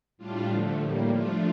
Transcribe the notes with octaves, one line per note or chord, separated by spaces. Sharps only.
A2 G3 D4 F4
D3 F3 A3
A2 G3 A#3
F3 A3 D4 F4